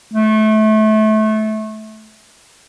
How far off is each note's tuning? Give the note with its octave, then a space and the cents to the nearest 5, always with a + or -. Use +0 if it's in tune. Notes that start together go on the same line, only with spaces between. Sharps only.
A3 -25